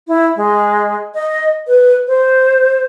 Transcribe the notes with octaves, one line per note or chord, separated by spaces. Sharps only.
E4
G#3
D#5
B4
C5